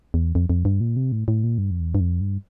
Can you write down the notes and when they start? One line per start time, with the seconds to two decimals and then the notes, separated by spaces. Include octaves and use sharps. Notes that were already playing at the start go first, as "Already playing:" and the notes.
0.14 E2
0.35 F2
0.50 F2
0.65 G2
0.81 A#2
0.96 C3
1.12 A2
1.28 A2
1.44 A#2
1.58 G2
1.71 F2
1.80 E2
1.95 G2
2.00 F2
2.21 G2